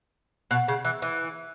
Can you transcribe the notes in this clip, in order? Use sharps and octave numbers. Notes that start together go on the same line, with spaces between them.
B2
C#3
E3
E3